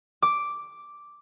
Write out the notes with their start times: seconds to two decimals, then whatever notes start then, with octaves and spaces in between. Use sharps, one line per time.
0.22 D6